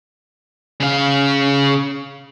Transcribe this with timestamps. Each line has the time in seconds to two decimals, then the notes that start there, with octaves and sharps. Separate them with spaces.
0.80 C#3 F5